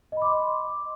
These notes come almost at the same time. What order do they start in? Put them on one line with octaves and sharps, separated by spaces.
D#5 B5 D6 C6